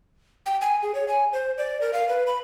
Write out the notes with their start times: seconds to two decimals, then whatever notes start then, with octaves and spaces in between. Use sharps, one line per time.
0.46 G5
0.61 G#5
0.83 G#4
0.95 C#5
1.08 G#5
1.33 C5
1.58 D5
1.81 A#4
1.93 F5
2.09 B4
2.27 B5